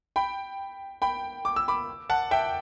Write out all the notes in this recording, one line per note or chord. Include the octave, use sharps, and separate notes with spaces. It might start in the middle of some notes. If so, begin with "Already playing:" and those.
G5 B5
G5 B5
D6
E6
B5 D6
F#5 A5
E5 G5